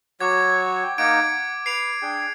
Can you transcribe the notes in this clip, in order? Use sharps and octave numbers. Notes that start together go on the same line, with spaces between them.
F#3 F#4 C#5 D6 G#6
G5
A#3 D#4 F#5 D6 G#6 D7
F#5
B4 C7 D7 F7
D4 G#4 G5